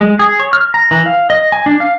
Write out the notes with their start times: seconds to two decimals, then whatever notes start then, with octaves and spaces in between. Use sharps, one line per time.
0.01 G#3
0.19 G#4
0.39 C#5
0.53 F6
0.74 A#5
0.91 E3
1.06 F5
1.30 D#5
1.52 G#5
1.66 D4
1.80 F5